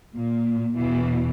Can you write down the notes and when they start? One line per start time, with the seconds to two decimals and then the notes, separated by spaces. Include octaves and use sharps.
0.14 A#2
0.75 E2 B2 E3